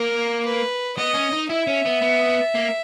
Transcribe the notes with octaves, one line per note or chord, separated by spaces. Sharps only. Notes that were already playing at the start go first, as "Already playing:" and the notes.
Already playing: A#3 A#4
B4
B3 D#5
C#4
D#4
E4 E5
C#4
B3
B3
A#3